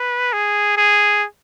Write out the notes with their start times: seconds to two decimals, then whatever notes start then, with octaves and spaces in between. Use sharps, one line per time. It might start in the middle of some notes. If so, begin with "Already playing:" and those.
Already playing: B4
0.33 G#4
0.77 G#4